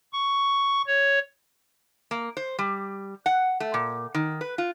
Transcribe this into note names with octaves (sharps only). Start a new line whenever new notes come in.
C#6
C#5
A#3
C5
G3
F#5
A3
A#2
D#3
B4
F4